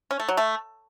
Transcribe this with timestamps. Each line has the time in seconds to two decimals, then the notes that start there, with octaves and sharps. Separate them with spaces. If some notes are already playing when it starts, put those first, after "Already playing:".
0.11 C#4
0.20 A3
0.28 F#3
0.37 A3